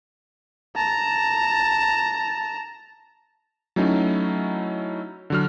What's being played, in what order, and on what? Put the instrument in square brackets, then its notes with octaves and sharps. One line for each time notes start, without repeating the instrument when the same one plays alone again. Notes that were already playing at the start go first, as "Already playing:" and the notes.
[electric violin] A5 A#5
[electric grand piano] F#3 A3 C#4 D#4 E4
D3 F#3 F6